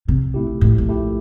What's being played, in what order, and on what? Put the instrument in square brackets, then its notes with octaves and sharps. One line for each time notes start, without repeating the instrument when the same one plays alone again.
[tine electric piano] A#1 [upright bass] C3
[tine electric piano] A#2 A3 E4 G4
[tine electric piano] A#1 [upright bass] A2
[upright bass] A2
[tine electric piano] A#2 A3 E4 G4